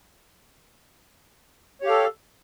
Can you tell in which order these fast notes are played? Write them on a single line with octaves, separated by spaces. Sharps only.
C#5 G4 F5 A4